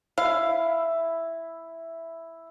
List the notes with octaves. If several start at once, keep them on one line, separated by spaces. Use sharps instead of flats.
E4 F5